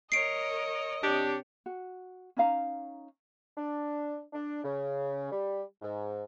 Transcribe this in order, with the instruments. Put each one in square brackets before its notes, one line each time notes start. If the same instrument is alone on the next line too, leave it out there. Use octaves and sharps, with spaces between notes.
[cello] A#4 C#5 [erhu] D#5 [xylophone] C7 D7
[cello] C3 C#5 [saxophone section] D4 G4
[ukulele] F#4
C#4 D#4 F5 A#5
[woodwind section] D4
D4
C#3
G3
G#2